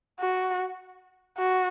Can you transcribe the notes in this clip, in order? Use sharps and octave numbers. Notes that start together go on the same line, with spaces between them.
F#4
F#4